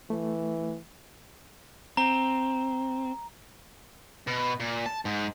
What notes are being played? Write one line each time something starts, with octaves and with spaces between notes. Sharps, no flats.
E3 A3
C4 A#5
B2
A#2
A5
G#2